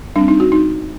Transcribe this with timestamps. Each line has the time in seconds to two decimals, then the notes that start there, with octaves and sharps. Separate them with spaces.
0.16 G3 C4 D4
0.28 D#4
0.40 F#4
0.52 D#4